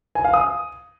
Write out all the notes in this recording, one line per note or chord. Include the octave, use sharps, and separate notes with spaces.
G#5
F5
D#6